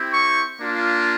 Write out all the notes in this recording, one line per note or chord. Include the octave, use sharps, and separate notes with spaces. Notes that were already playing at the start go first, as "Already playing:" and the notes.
Already playing: C4 E4 G4
C#6
A#3 D4 F4